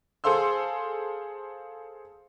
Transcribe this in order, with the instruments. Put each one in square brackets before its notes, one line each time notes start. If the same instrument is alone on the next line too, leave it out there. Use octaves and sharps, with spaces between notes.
[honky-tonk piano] G#4 A4 C5 F5 C6 E6